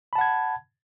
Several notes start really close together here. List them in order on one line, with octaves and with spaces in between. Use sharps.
B5 A5 F#5 G#6